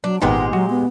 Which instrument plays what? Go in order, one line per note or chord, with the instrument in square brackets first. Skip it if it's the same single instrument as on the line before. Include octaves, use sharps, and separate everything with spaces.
[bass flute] F#3 [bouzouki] D4
[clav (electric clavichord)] G#1 B3 D#4 [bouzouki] A#2 G#3 G4 [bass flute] F#5
[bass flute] F#3 [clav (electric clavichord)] F#4
[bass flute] B3